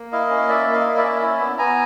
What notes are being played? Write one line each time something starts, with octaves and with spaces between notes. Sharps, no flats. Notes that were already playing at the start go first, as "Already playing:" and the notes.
Already playing: A#3
E4 D#5 F5
C#4
A#3 D5 E5
A#3
D#5 F5
E4
D5 E5
C#4
E4
B3
B3 G#5 A#5